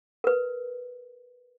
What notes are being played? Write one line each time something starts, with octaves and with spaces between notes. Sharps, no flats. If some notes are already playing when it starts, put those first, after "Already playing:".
A#4 B4